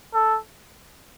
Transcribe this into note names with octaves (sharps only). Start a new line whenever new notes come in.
A4